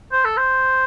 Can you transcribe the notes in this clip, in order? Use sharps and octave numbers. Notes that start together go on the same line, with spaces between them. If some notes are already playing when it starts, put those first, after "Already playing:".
C5
A4
C5